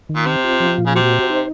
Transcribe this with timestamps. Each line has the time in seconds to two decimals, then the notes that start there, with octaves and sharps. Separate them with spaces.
0.09 D#3
0.15 A#2
0.26 C3 C4
0.44 F4
0.60 F3
0.78 A#2
0.86 C#3
0.95 C3 F#4
1.12 C5
1.30 D#4